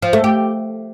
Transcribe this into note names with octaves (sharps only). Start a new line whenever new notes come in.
F3
A3
G4